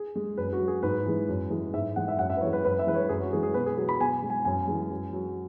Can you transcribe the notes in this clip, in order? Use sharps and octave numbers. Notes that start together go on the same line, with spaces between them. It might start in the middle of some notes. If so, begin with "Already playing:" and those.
Already playing: G#4
G#3
F#2 B4
F#4
F#3
G#4
G#2 B4
E3 G#3
F#2
E3 G#3
G#2 E5
E3 G#3 F#5
E5
F#2 F#5
E5
B4
E3 G#3 C#5
B4
F#2 B4
E5
E3 G#3 B4
C#5
F#2 G#4
F#4
E3 G#3 G#4
G#4
B2 B4
G#4
F#3 G#4
B5
B2 G#5
G#3
G#5
F#2 G#5
E3 G#3
F#2
F#3